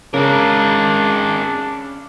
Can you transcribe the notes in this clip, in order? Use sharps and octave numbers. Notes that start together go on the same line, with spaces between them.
C#3 G#3 D4 A#4